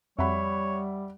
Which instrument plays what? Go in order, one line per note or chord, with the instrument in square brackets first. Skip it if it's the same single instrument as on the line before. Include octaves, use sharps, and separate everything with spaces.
[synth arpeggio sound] F2 [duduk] G3 [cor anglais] C#5 [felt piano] E5 F#5 B5